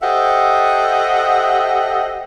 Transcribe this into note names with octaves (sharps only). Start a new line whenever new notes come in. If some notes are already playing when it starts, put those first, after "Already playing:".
G4 A4 C5 D#5 E5 F#5